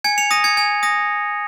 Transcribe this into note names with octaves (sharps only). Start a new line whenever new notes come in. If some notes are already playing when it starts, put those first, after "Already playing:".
G#5 G#6 C#7
C#7 F7
D#6 A#6 D#7
G#6 C#7
G#5 G#6
D#6 A#6